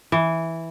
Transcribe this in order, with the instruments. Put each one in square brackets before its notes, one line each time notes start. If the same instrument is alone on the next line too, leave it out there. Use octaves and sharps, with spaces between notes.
[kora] E3